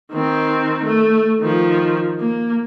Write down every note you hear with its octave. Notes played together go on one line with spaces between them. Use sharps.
D#3 C4
A3
D#3 F3
A#3